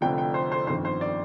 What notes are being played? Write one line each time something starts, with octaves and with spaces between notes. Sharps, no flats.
F1 F2 D3 F3 G5
G5
C5
C5
G1 F2 D#3 C5
C5
D5